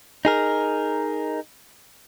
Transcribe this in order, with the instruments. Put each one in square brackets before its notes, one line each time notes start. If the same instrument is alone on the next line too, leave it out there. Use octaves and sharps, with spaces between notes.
[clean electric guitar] D#4 G#4 A#4